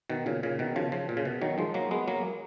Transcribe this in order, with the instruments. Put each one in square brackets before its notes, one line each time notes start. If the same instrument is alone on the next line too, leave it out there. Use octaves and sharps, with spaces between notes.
[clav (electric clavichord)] B2 D#3
A#2 C#3
A#2 C#3
B2 D#3
C#3 F3
C#3 F3
A#2
C#3
B2
D#3 F#3
F3 G#3
F#3 A#3
G#3 B3
F#3 A#3